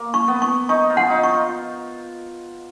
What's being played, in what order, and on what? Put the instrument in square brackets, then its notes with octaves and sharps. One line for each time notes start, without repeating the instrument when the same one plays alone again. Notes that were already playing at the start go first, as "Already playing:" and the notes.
Already playing: [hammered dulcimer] A#3
[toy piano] C#6
[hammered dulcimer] B3
[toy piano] C#6
[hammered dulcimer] D#4 [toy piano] C#6
[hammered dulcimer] F4
[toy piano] F#5
[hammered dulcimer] D#4
[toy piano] C#6
[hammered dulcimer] F4